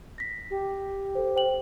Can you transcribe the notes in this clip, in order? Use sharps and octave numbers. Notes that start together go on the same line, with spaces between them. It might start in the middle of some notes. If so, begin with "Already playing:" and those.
A#6 B6
G4
A4 C5
C5 G5 F#7